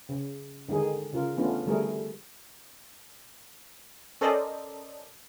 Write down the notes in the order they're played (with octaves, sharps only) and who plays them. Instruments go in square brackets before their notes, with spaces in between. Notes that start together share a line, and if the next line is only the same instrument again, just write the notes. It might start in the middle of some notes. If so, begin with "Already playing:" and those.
[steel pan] C#3
D3 D#3 G#3 D#4 G#4
C#3 F4 A#4
E3 A3 B3 C#4 D4 F4
D3 E3 G3 A3 G#4 A#4
[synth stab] C#4 A4 A#4 C5 D5 D#5